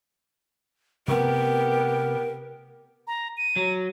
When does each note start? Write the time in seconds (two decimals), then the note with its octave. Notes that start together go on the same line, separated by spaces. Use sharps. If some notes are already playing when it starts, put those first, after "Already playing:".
1.08 C3 A3 B3 G4 A#4
3.07 A#5
3.37 D#7
3.56 F#3